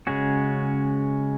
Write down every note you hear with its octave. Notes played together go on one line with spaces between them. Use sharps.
C#3 G#3 C#4 F#4